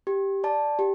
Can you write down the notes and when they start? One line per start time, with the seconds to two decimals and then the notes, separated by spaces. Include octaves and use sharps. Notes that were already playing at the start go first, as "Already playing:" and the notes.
0.07 G4
0.44 D5 A5
0.79 G4